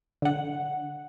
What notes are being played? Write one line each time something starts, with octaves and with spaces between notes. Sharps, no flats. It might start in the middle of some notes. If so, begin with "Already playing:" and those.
D3 F#5